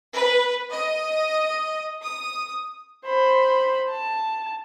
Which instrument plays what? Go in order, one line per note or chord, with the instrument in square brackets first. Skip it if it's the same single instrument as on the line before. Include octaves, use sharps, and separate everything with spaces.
[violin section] B4
D#5
D#6
[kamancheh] C5 B5
A5